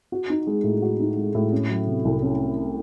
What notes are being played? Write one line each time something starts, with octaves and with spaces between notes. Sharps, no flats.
F#4
D#4
G#3
A2
F#4
D#4
G#3
A2
C#4
F#3
C3
C2
C#4